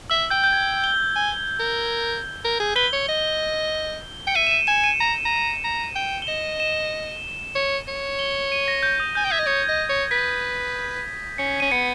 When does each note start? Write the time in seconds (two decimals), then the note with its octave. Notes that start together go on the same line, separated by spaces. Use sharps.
0.10 E5 E6
0.30 G5 G6
0.44 G6
0.53 G#6
0.84 G7
1.16 G#5
1.59 A#4
2.44 A#4
2.60 G#4
2.75 B4 G7
2.93 C#5
3.08 D#5
4.27 G5 C#7
4.35 E5 D#7
4.47 E7
4.51 D#7
4.67 G#5 E7
4.84 D#7
5.00 A#5
5.25 A#5
5.64 A#5
5.96 G5
6.22 G7
6.27 D#5 E7
6.60 E7
7.55 C#5
7.88 C#5
8.19 G7
8.52 D#7
8.68 A#6
8.83 G6
9.00 D#6
9.15 G#5 G6
9.24 G5
9.31 E5 G#6
9.39 D#5
9.47 C#5 G#6
9.68 D#5
9.89 C#5
10.11 B4 B6
11.38 C#4 C#7
11.60 C#4 D#7
11.71 B3 C#7